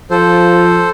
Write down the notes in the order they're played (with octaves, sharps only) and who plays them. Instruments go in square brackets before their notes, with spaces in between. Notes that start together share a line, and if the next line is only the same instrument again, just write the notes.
[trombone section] F3 [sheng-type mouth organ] A4 C5